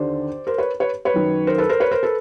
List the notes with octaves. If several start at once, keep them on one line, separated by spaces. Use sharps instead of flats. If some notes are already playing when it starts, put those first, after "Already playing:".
Already playing: D#2 D3 C5 D5
A#4 C5
B4 C#5
B4 C#5
B4 C#5
F#2 D#3
A#4 C5
A4 B4
A#4 C5
B4 C#5
A#4 C5
A4 B4